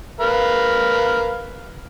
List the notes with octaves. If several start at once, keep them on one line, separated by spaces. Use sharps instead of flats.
A#4 B4 F5